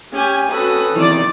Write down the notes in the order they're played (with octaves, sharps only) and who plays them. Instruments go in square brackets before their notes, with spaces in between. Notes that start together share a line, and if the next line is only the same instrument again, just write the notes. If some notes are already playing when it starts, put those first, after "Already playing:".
[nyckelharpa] C#4 [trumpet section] G4 [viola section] G#5
[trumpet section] C4 C#4 A4 [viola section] F#4 B4 [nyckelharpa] D#6
[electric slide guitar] E2 C3 E3 [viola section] D#3 D5